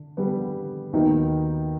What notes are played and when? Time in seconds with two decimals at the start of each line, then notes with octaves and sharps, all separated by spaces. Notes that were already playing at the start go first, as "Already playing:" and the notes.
Already playing: D3
0.17 D3 G3 B3
0.93 D#2 D#3 F#3 B3 D#4